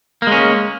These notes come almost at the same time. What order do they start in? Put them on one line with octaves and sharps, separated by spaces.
A#3 G#3 C#4